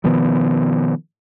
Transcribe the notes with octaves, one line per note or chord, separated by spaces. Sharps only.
B2 D#3 F3 B3